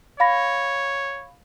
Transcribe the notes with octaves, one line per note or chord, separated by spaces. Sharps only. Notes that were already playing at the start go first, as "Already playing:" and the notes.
C#5 F5 B5 A#6